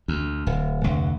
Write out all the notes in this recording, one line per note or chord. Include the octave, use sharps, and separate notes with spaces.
D2
D1
F1 D2